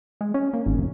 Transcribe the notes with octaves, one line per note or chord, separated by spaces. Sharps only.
G#3
C#4
A#3
G#1
F1